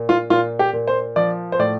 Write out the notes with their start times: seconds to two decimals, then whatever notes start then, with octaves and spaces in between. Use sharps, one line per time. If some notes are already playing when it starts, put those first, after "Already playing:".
Already playing: A#2
0.09 F4
0.30 A#2 F4
0.59 G4
0.73 A#2
0.88 C5
1.16 F3 D5
1.52 C5
1.59 A2 D5